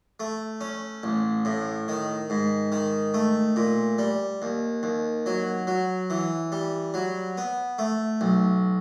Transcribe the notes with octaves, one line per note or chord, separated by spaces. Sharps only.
A3
C#4
A1
A2
D#3
G#2
D#3
A3
A#2
G3
D#2
D#2
F#3
F#3
E3
G3
F#3
B3
A3
B1